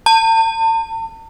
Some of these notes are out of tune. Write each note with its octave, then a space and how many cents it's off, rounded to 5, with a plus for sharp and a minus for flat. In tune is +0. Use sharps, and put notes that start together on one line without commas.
A5 +40